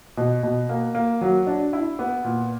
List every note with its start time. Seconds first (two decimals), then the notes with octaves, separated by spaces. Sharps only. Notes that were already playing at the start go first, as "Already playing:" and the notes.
0.17 B2
0.43 B2
0.69 A#3
0.95 A#3
1.21 F#3
1.47 D4
1.73 E4
1.99 B3
2.24 A#2